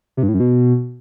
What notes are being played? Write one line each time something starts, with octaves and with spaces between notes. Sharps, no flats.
C3
G2
A2
F#2
B2